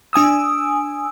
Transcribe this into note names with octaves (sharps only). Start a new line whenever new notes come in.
D4 G#5 D#6 E6